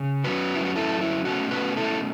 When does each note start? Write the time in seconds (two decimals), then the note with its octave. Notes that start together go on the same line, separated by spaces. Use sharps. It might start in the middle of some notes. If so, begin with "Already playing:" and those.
Already playing: C#3
0.24 F#2 F#3 C#4 F#4 B4
0.55 E4
0.65 F#4
0.76 E4 A4
1.01 E4
1.25 B2 A3 C#4 F#4
1.51 F#4 B4
1.77 E4 A4